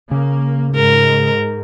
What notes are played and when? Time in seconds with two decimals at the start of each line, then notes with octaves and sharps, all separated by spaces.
0.11 C#3 A#3
0.75 G#2 A#4